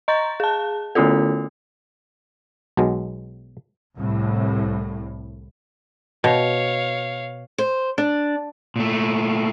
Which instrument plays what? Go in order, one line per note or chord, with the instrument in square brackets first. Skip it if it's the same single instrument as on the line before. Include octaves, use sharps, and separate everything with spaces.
[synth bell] D#5 A#5 C#6 A6
G#4 A5
D3 A3 C#4 E4 F4 A4
[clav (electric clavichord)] B1 B2 F#3 G#3
[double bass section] C2 A2
[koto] B2 [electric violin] C#5 F5
[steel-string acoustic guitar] C5
D4
[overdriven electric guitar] A#2 A3